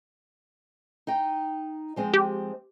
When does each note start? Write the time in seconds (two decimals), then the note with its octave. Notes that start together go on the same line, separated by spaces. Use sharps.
1.07 D#4 D#5 G5
1.96 F3 G#3 C4
2.14 G4